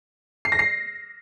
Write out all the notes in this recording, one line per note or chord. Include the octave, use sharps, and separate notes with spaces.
C7
A#6
C7